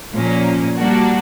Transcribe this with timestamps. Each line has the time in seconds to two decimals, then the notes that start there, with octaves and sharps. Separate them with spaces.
0.14 A#2 F3 A#3 C#4
0.76 G3 A#3 D4 F#4